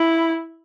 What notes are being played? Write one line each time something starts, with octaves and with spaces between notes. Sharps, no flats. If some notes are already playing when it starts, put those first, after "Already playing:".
Already playing: E4